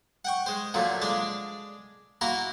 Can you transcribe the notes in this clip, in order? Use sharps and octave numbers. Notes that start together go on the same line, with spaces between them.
F#5 G5 C#6
G#3 C5
A#2 D3 F3 F#3 A3
G#3 D4 D5
A#3 E4 F#4 A#5 C6